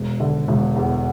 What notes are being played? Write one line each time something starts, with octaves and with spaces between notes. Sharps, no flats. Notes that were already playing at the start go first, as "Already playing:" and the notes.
Already playing: E1
D3
E1
E2